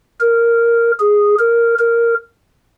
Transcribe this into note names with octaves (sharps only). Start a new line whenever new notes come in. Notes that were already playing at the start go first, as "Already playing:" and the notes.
A#4
G#4
A#4
A#4